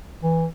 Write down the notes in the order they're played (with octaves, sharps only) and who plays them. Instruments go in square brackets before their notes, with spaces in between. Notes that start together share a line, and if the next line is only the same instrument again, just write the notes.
[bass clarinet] E3